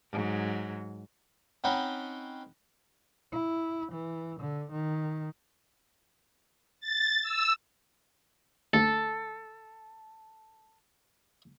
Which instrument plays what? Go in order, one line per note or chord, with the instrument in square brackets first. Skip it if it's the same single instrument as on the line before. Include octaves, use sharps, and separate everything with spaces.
[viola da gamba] G#2 F#3
[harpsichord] C4 C#4 D#4 F#5 G5 B5
[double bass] E4
E3
D3
D#3
[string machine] A6
E6
[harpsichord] D2 [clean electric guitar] A4